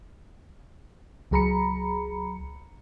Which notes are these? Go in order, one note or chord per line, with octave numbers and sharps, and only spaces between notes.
C#2 F#3 G#4 A#5 B5 C#7